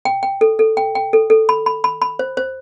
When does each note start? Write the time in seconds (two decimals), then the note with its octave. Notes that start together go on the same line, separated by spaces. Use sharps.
0.05 G5
0.23 G5
0.41 A4
0.59 A4
0.77 G5
0.95 G5
1.13 A4
1.30 A4
1.49 B5
1.66 B5
1.84 B5
2.02 B5
2.19 C5
2.37 C5